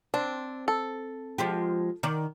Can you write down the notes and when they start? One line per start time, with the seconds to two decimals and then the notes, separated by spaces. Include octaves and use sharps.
0.14 C4 D4
0.68 A4
1.38 F3 G#3 G4
2.03 D#3 D5